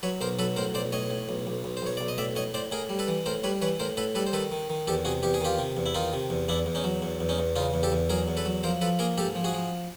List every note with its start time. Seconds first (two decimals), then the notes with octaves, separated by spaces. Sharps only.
0.03 F#3 B4 C#5
0.21 B1 A#4 C5
0.39 F#3 A4 B4
0.56 A2 A#4 C5
0.74 B1 C5 D5
0.92 A2 C#5 D#5
1.10 A2
1.29 B1
1.47 B1
1.64 B1
1.77 C5
1.82 B1 C#5
1.97 B1 D5
2.08 D#5
2.18 A2 D5 E5
2.36 A2 C#5 D#5
2.54 A2 C5 D5
2.72 A2 G#4 A#4
2.89 G3
2.99 A4 B4
3.08 E3
3.26 A2 A#4 C5
3.44 G3 B4 C#5
3.62 E3 B4 C#5
3.79 A2 A#4 C5
3.97 A2 A4 B4
4.15 G3 A4 B4
4.27 C5
4.33 D#3 A4 B4
4.52 D#3
4.70 D#3
4.87 E2 G4 A4
5.05 C3 F#4 G#4
5.23 E2 G4
5.34 G#4
5.41 D#3 F4 G4
5.58 C3
5.77 E2
5.86 E4
5.94 D#3 D#4 F4
6.13 C3
6.30 E2
6.48 E2 D4 E4
6.66 E2
6.75 C#4 D#4
6.84 F#3
7.02 E2
7.20 E2
7.29 C#4 D#4
7.38 E2
7.56 C#3 D#4 F4
7.74 E2
7.83 G4 A4
7.92 E2
8.09 F#3 G#4 A#4
8.28 E2
8.37 A4 B4
8.46 F#3
8.63 F3 A#4 C5
8.81 F3 A4 B4
8.99 A#3 G#4 A#4
9.18 G#2 G4 A4
9.35 F3
9.44 F#4 G#4
9.53 F3